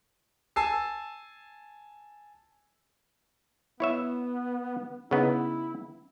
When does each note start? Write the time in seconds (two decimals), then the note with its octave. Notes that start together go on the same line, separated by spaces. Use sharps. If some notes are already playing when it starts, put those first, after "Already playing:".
0.56 G#5 A5 E6 C7
3.80 B3 E4 C#5 E5
5.11 C#3 B3 D#4 E4